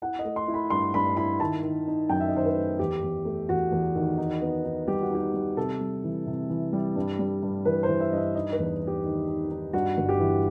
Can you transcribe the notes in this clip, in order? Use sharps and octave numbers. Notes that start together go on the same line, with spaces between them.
E4 F#5
D#5
A3
C6
E4
B5
G2 C6
G2 B5
E4 B5
D#3 A5
D#3
D#4
F#2 G5
E5
D#5
D#3 C5
B4
A3
E2 G4
E2
A3
E2 F#4
E2
D#3
D#4
B3
D#4
G3 G4
F#4
D#4 G4
G3
C3 A4
G3
E3
C3
E3
G3
G2
G3
G2
E3 B4
C5
E3
E5
G2 D#5 E5
D#4 D#5
B4
E2
D#4
G4
D#3
D#4
D#4
G2 F#4
G1
G4
E3